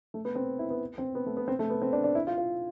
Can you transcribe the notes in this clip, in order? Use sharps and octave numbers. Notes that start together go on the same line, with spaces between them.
A3
B3
C4
E4
B3
C4
B3
A3
B3
C4
A3
B3
C4
D4
D4
E4
F4
F4